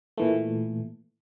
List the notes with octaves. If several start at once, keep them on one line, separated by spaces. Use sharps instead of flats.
A#2 E3 A3